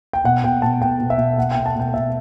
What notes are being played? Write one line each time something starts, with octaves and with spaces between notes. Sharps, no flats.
G5
B2 F#5
B2 G5
B2 A5
B2 G5
B2
E5
B2
B2 F#5
G5
B2
A5
B2 G5
B2 E5